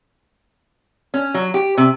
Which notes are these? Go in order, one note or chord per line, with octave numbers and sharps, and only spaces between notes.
C#4
F#3
G4
C3